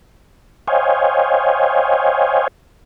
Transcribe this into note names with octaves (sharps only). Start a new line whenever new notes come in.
C5 C#5 D#5 F5 G5 G#5